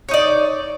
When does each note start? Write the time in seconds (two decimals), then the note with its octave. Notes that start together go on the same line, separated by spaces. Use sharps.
0.09 C#5
0.11 D#4
0.14 D5